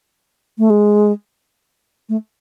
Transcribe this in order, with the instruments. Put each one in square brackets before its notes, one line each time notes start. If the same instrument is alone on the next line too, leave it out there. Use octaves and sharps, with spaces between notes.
[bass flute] A3
G#3
A3